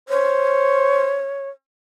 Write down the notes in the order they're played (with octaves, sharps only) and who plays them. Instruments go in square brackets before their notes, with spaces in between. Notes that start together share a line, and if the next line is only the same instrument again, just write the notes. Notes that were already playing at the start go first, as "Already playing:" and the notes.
[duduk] C5 [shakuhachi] C#5